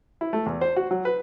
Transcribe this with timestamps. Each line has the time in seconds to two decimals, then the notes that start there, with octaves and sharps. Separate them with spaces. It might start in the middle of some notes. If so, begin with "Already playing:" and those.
0.21 E4
0.33 A3
0.46 E2
0.61 C5
0.76 F#4
0.91 F#3
1.05 B4